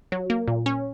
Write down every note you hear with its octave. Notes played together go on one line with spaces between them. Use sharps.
F#3
A#3
A#2
C#4